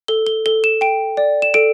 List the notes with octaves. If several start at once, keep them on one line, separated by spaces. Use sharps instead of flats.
A4 G7
G7
A4 G7
E7
G5 D7
D5
E7
A4 D7